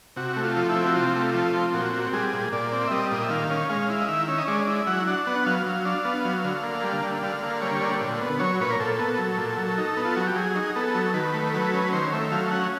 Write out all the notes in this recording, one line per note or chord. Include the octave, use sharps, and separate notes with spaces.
C3 F#4
A3
F4
F3
E4
C4
F#4
C3 F4
A3
F3
C4
A#2 F#4
C4
G3 G#4
A#2
A#2 D5
C4
E5
G3 D#5
A#2
E5
D#3 F5
C#4
G#3 F5
E4
D#5
D#3 E5
C#4
D#5
G#3 D5
E4
F#3 F#5
D4 F#5
B3 F#5
F#3 F5
F#3
D4
B3
F#3
D3
A#3
G3
D3
D3 F5
A#3
G3 C#5
D3
A#2
B3
F#3 C#5
A#2 B4
A#4
A#2 A4
B3
F#3
A#2
F#3
D#4
B3
F4
F#3 F#4
G4
F#3 G#4
D#4
B3 A4
F#3
D#3 B4
A3
F#3 B4
C#4
D#3 C5
A3 E5
F#3 F5
C#4 F#5